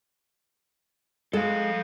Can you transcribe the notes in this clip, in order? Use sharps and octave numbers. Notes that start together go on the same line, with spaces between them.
G#3 A4 F5